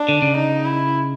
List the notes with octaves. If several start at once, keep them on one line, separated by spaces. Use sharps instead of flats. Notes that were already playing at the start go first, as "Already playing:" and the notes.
Already playing: D4
D3
C#3
D#4
E4